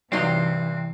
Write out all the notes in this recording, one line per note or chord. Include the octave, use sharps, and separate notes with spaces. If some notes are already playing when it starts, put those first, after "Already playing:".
G2 C3 E3 F#3 C4 D#4 C6